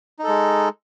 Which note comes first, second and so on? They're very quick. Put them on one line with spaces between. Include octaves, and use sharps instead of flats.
D#4 A4 G#3